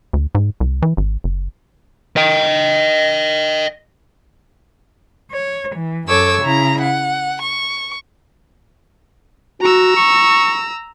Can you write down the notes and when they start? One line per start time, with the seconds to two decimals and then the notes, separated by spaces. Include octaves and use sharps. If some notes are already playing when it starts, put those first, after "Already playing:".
0.13 D2
0.35 G#2
0.60 C2
0.82 E3
0.97 G#1
1.24 F#1
2.17 D#5 G5
5.30 C#5
5.74 E3
6.07 F#2 A4 C#5 D6 E6
6.41 C#3 E4 A#5
6.80 F#5
7.40 C#6
9.62 F#4 A#5 E6
9.96 C#6